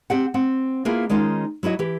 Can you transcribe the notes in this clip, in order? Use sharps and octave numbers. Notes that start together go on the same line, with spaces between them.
C4 G4 F#5
C4 F#5
A#3 B3 E4 F4 G#4
D#3 G#3 C#4 D#4 F4
F#3 E4 F#4 D#5
E3 G4